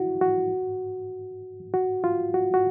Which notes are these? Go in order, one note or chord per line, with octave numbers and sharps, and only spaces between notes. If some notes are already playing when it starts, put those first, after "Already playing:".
Already playing: E4 F#4
F#4
F#4
F4
F#4
F#4